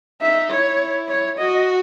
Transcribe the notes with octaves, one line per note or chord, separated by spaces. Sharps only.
D#4 E5
E4 C#5
C#5
F#4 D#5